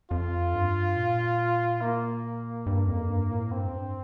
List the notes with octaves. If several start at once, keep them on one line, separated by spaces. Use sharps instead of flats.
F2 F4
G2
A#2
A#3
G2
F2
G2
A2
G2 C4
F2
G2